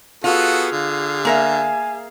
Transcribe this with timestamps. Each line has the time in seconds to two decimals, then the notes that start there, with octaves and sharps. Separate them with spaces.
0.24 B3 F4 F#4 G#4 A4 F5
0.72 D3
1.25 A#3 A#4 E5 G#5